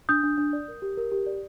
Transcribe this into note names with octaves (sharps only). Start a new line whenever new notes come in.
D4 D#6 G6
D4
D4
D5
A#4
G4
A#4
G4
D5